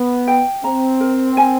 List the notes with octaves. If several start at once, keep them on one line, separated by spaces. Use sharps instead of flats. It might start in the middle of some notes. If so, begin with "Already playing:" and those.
Already playing: B3
G5
C4 A#5
A#4
G#5